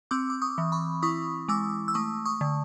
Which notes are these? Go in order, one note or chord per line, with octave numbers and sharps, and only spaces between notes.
C4 D6 E6
D6
C#6 D#6
E3
B5 C#6
E4 C#6 D#6
G#3 D6 E6
E6
A3 C#6 D#6
C#6 D#6
D3